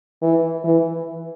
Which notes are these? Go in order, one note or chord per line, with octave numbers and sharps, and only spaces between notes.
E3
E3